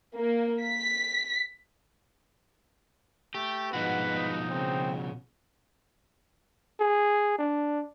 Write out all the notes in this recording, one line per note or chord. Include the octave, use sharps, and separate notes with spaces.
A#3
B6
A3 G4
G#2 B2 F3 F#4 B4 F#5
D#4
C#3 C4
G#4
D4